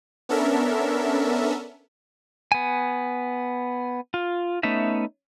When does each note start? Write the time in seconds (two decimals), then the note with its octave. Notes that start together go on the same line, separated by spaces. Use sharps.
0.29 B3 C#4 D4 A4 A#4 E5
2.52 B3 G#5
4.14 F4
4.63 A3 B3 C#4 D#4 E5